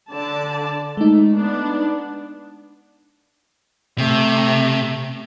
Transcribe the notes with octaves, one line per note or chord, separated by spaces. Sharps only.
D3 D5 A5
G#3 A3 D#4
B3 D4
C3 A3